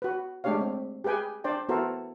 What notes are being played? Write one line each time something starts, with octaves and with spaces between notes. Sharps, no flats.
F#4 B4
G#3 A3 D4 G4 C#5 F5
C4
G4 G#4 B4 G5 G#5
D4 C5 D5 G5
B3 E4 F#4 A4 A#4 C5